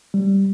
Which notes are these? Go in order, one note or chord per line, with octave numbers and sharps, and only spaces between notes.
G3